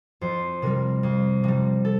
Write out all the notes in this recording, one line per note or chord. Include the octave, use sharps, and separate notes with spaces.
F2 C5
C3 G3 A#4
F2
C3 G3
A4